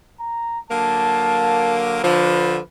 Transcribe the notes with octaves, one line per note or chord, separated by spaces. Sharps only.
A#5
D3 F#3 A#3 A5
D3 F3 B4